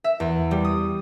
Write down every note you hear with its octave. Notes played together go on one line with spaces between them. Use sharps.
E5
E2
G3
D#6